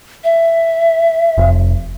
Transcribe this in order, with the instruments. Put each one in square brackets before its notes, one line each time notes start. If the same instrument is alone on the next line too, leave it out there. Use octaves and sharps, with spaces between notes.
[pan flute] E5
[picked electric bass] F1